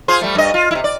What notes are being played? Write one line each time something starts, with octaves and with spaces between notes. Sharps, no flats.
F4 G#4 C5
G3 A3
G2 D#5
F4
C3 E4
D5